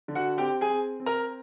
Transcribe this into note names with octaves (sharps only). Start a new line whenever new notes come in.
D3
F#4 F#5
C4 G4 G5
G#4 G#5
C4
C4
A#4 A#5